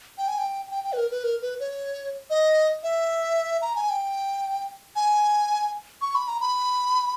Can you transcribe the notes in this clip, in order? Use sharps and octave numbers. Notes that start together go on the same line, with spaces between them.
G5
G#5
G5
G5
G5
B4
A#4
B4
A#4
B4
C#5
D#5
E5
A#5
G#5
G5
G#5
C#6
B5
A#5
B5